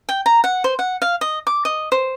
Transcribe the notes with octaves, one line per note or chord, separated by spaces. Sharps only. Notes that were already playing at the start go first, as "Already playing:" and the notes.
G5
A#5
F#5
C5
F#5
F5
D#5
D6
D#5
C5